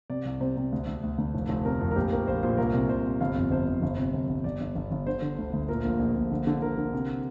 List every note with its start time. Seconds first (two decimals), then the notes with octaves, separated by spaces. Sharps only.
0.10 C3 D5
0.25 C2
0.40 C3 C5
0.57 C3
0.72 D2
0.87 D2
1.03 D2
1.18 D2
1.34 F1
1.49 F1
1.65 C3 A#4
1.81 F2
1.91 A#4
1.96 A#1 G4
2.12 A#1 A#4
2.27 A#1 C5
2.43 A#2 C5
2.58 C2 A#4
2.74 C3
2.89 C3 C5
3.05 C3
3.21 G1 F5
3.36 F2
3.51 G1 C5
3.68 G1
3.82 G1
3.97 C3
4.13 G1
4.29 G1
4.44 G1 D5
4.61 G1
4.75 G1
4.91 G1
5.07 D3 C5
5.22 D3
5.38 D2
5.53 D2
5.69 A#2 A#4
5.84 A#1
5.99 A#1
6.15 A#1
6.31 D3
6.47 D3
6.62 D3 A#4
6.78 D3
6.93 C3